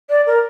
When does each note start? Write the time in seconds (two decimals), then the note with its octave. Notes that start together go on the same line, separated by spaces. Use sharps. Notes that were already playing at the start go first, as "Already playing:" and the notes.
0.09 D5
0.26 A#4